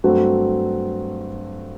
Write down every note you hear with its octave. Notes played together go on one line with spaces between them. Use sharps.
G2 F#3 A3 C4 F#4